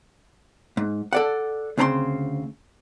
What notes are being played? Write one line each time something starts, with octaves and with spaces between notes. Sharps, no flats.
G#2
A4 D5 F#5
D2 C#3 C4 A#5 C6